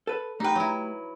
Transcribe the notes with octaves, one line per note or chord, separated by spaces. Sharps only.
A4 B4
A3 D#4 G4 B4 G5
F#3 E4